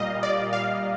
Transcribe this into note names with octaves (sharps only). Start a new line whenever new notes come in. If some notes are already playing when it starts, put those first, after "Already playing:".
Already playing: A#2 G3 A#3 D#5 F5
D5
F5